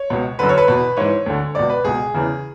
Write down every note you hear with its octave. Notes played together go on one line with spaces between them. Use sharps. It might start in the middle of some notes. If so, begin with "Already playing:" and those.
Already playing: C#5
C#2 B2
F#2 D3 B4
C#5
B4
E2 B2
G#2 E3 C#5
D2 D3
C#2 B2 D5
B4
C#2 B2 G#4
E2 C#3 E3